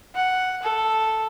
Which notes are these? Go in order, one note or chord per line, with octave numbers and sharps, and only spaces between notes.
F#5
A4